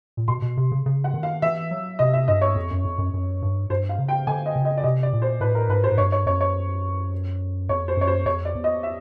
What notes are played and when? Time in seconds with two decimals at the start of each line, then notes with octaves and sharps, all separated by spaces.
0.17 A#2
0.28 B2 C6
0.42 B2
0.57 C3
0.72 C#3
0.86 C#3
1.04 F#5
1.14 D#3
1.23 F5
1.42 E3 E5
1.71 F#3
1.99 C3 D#5
2.13 E5
2.28 G2 D#5
2.42 C#5
2.56 F2
2.71 F#2
2.85 F2
2.98 F#2
3.14 F#2
3.42 G2
3.70 G2 C5
3.89 F5
3.99 C#3
4.08 G5
4.27 D3 G#5
4.46 D#5
4.56 C#3
4.65 D#5
4.77 D5
4.84 C3 D#5
5.03 D5
5.13 A#2
5.22 C5
5.40 A2 B4
5.55 A#4
5.69 G#2 B4
5.84 C5
5.91 G#2
5.98 G2 C#5
6.12 C#5
6.26 F#2 C#5
6.41 C#5
7.69 F2 C#5
7.88 C5
7.97 F#2 C#5
8.07 C5
8.26 F2 C#5
8.45 D5
8.55 E2
8.64 D#5
8.83 E5